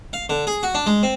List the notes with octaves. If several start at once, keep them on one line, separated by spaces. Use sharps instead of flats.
F5
D3
G#4
F#4
D4
G#3
C4